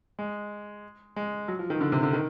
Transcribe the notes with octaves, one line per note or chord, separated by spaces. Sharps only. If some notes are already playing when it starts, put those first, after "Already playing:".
G#3
G#3
F#3
F3
D#3
D3
C3
D3
D#3